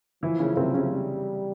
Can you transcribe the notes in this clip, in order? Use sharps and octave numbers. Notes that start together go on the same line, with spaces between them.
E3 F3 E4
C#3 C#4
C3 C4
C#3 C#4
G3